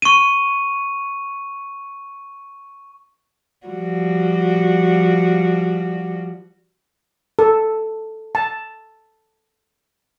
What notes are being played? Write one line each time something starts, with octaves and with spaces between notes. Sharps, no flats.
C#6 D#7
F3 G3 F#4
A4
A5